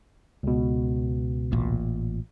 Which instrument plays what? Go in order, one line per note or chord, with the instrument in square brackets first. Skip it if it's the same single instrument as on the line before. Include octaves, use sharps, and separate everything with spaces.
[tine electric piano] C#2 B2
[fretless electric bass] A1 A#2